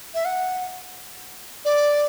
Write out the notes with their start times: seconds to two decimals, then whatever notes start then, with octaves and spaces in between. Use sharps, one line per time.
0.14 E5
0.25 F#5
1.65 D5